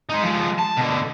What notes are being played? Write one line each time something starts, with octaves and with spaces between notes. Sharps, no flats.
G#3 D#4
F3 G#3
A5
B2 D3